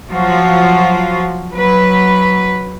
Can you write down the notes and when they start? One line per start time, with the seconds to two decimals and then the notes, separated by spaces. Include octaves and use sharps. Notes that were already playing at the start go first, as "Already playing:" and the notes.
0.11 F3 F#3 F4 F#4
1.52 F#3 B4